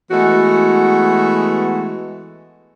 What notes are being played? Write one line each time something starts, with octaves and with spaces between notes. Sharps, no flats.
E3 G#3 A3 B3 F#4